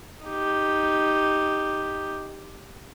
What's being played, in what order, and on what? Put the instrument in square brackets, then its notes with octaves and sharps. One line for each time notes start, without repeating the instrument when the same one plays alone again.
[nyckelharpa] D#4 G4